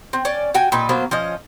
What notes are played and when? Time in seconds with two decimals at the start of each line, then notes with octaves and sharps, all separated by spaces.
0.13 C4
0.25 C#4 D5
0.54 F#4 G5 G#5
0.72 A#2 D#4 B4 G#5
0.89 F#3 A#3 B3 C5
1.11 F3 C#4 D#5